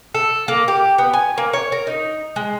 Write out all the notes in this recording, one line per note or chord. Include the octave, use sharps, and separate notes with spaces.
A4
A#3
G4
B3
G#5
A#3
C#5
A#4
D#4
G#3